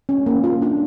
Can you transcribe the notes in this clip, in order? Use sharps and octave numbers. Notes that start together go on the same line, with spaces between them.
C#4
A#3
F4
D4